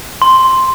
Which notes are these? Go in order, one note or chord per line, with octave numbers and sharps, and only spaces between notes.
C6